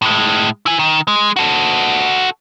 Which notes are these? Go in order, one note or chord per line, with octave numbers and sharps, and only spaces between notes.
A2 G#3
E4 G#5
D#3
G#3
F#4 A4